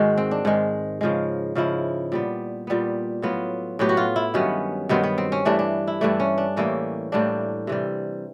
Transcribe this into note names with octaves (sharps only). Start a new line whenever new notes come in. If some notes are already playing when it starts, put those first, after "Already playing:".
Already playing: G#2 D#3 G#3 F#4
C4
D4
G#2 D#3 G#3
C#3 F3 G#3
C#3 F3 G#3 E4
A#2 G3 B3
A#2 G3 B3
A2 F#3 B3 F4
A2 F#3 B3 G4
F#4
F4
E4
G2 D#3 F#3 B3 C#4
G2 D#3 F#3 B3 C4
B3
C4
C#4
G2 E3 A3 D4
D4
E4
G2 E3 A3 D4
C#4
D4
A2 E3 G3 A#3 C#4
A2 E3 G3 A#3 D4
C3 E3 G3